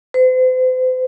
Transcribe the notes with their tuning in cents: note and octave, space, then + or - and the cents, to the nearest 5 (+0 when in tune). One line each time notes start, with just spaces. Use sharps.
C5 -40